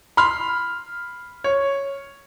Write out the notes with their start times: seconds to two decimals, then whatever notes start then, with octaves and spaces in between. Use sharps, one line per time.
0.17 B5 C6 F6
1.44 C#5